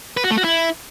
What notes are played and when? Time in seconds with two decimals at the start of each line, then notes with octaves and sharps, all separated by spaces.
0.17 B4
0.24 F#4
0.31 A3
0.37 F#4
0.44 E4